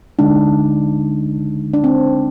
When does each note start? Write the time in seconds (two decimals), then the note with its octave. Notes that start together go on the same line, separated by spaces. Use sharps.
0.19 D2 D3 G#3 D4 D#4
1.74 D4
1.84 C4